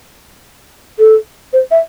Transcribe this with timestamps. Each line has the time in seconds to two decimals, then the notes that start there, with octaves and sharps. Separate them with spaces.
0.98 A4
1.53 C5
1.71 E5